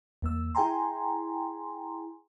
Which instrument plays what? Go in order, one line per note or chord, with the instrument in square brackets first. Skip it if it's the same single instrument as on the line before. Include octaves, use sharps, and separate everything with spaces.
[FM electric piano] E2 A#3 E6
E4 G#4 G5 G#5 A#5 C6